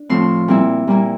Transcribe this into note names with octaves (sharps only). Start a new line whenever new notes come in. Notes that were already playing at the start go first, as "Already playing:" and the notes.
Already playing: D4
A2 F3 A3 C4 C6
A#2 G3 C4 E4
A#2 G3 A#3 E4